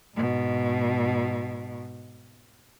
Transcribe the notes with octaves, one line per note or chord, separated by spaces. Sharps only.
G#2 B2